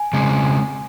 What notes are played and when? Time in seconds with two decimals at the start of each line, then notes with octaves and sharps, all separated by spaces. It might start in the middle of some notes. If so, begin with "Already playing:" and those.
Already playing: G#5
0.13 C#3 G#3 C4